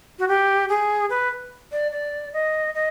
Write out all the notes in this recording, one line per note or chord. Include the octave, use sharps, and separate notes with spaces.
F#4
G4
G#4
B4
D5
D5
D#5
D#5